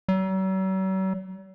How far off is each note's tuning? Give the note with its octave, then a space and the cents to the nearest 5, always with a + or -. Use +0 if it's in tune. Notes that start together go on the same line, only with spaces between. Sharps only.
F#3 +45